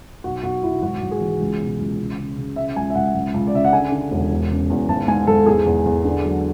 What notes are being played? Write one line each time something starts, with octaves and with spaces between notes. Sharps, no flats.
B1 F#4
B1 F#4
B1 E4
G#1 F#4
G#1
G#4
E3
C#2
B2
C#2
C#3
C#3
C#3
C#3 E5
C#2 G#5
E5
C#2 F#5
C#2
C#2
D5
C#3 E5
F#5
D3 G#5
D3
E1
E2
C#3
E2
G#1 A5
G#2 G#5
G#1 A4
E2 G#4
E2
E2
D3
F#3